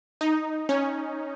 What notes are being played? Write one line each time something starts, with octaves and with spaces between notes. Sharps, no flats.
D#4
C#4